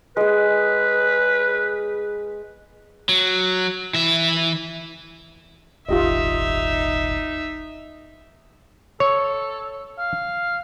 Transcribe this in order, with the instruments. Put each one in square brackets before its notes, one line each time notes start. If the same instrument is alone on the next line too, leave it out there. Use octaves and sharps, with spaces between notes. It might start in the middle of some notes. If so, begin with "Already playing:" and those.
[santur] G#3 G#4 [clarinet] B4
[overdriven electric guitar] F#3
E3 E5
[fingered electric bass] D#1 G#1 [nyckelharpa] D#4 E5 [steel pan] F4 G4 D#5
[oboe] A4 [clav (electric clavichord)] C#5
[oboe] F5